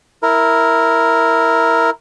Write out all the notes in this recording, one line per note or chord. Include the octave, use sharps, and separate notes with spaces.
E4 A#4